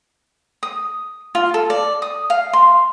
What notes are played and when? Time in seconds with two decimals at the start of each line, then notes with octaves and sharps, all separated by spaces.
0.63 D#6
1.35 F4
1.54 A4
1.70 D5
2.02 D#6
2.30 F5
2.53 C6